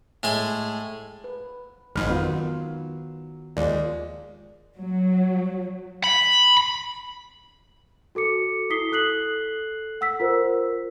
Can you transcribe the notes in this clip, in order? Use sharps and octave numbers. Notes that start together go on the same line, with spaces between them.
A2 G#3 G#4
B4
G#1 F2 G#2 D#5 B5 F6
D#3 F#3 B3 F4
D#2 F3 G#3 A#3 D5
F#3
B5
F#4 A4 D6 C#7
E4 A4 D#6 B6 C7 G7
A4 F#6 C7 F#7
F#5 E6 B6
F4 A#4 C5